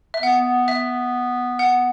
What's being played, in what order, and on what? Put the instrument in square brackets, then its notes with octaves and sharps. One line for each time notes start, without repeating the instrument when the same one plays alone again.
[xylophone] E5
[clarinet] B3 [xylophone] F#5
[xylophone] E5
F#5